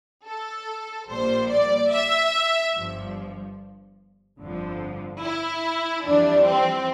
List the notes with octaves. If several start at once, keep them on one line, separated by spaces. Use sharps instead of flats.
A4
A#1 A#2 G3 C5
D5
E5
G1 G2 F3
G1 F2 D3 F3
E4
F2 E3 G3 D4
C4